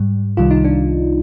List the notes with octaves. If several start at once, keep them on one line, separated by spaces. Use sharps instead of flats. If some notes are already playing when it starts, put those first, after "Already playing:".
Already playing: G#2 G3
C2 C3 D#3 G3 F4
D#4
D4